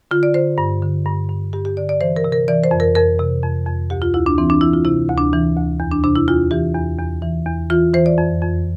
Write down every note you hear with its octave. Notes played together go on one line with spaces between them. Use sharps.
D3 F4
D5
D3 C5
G2
D3
G2
G2
G2 G4
G4
D3 D5
D5
E3 C5
A#4
C3
A#4
E3 D5
C5
F2
A#4
F2 A#4
C3
F2
F2
D2 G4
F4
D2 E4
D4
E3 C4
D4
E3 E4
F4
C3 E4
D2
D4
E3
D2
E2
D4
C3 D4
E4
E2 F4
E3 G4
E2
E2
E3
E2
E3 F4
E3 C5
D5
F2
F2